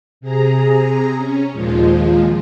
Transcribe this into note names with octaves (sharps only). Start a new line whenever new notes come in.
C3 G#4 A#5
C#4
D#2 A#2 F3 G#3 F4